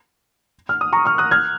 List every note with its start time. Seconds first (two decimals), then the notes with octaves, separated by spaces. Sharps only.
0.69 F6
0.81 D#6
0.93 A#5 C#6
1.05 C#6 F6
1.18 D#6 F#6
1.31 F6 G#6